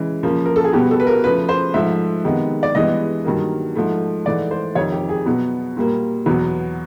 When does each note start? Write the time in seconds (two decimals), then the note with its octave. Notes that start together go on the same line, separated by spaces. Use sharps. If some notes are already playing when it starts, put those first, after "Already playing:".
Already playing: C#3 E3 G#3
0.23 C#3 F3 A#3
0.46 A#4
0.56 A4
0.64 G#4
0.73 B2 G3 B3 G4
0.91 A4
1.00 B4
1.07 A#4
1.24 C#3 F3 A3 B4
1.49 C5
1.74 G#2 F3 A3 E5
2.24 C3 D#3 G#3 B3
2.63 D5
2.75 G2 E3 G#3 B3 D#5
3.25 G2 D#3 F#3 A#3
3.75 G#2 F3 A3
4.25 G#2 E3 A3 D5
4.51 C5
4.75 F2 C3 D#3 C#5
4.92 G4
5.09 G#4
5.26 B2 F#3 B3
5.77 A#2 G3 A#3
6.26 E2 B2 F#3 B3